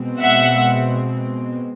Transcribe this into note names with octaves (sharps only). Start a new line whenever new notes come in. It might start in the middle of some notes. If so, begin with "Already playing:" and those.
Already playing: B2 G#3 C4
E5 F#5